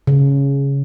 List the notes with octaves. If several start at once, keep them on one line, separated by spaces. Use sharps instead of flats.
C#3